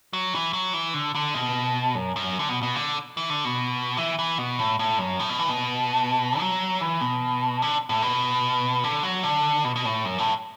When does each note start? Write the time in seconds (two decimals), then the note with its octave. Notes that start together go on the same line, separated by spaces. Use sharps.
0.13 F#3
0.33 E3
0.53 F#3
0.73 E3
0.94 D3
1.15 D3
1.35 B2
1.95 F#2
2.16 F#2
2.39 D3
2.49 B2
2.63 B2
2.76 D3
3.17 E3
3.30 D3
3.44 B2
3.97 E3
4.19 E3
4.38 B2
4.59 A2
4.79 A2
4.99 F#2
5.19 A2
5.29 B2
5.39 E3
5.49 B2
6.40 F#3
6.81 E3
7.01 B2
7.62 D3
7.89 A2
8.02 B2
8.84 D3
9.03 F#3
9.23 D3
9.65 B2
9.76 B2
9.85 A2
10.05 F#2
10.18 A2